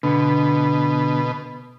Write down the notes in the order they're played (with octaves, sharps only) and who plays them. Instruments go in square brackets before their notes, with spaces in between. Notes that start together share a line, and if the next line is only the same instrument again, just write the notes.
[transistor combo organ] B2 [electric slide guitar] D3 B3